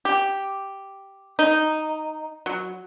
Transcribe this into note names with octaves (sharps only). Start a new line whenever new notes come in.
G4
D#4
F#3